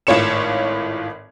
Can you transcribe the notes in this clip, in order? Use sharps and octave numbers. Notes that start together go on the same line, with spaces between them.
G#1 A2 F4 C#5 C#7 E7